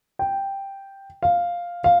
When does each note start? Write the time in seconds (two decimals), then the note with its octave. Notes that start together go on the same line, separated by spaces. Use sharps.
0.19 G5
1.23 F5
1.84 F5